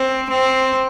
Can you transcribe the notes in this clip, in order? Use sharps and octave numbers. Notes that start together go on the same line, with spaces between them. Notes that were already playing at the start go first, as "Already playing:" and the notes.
Already playing: C4
C4